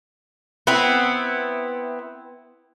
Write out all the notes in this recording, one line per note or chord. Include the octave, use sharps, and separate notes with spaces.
B3 C4 E4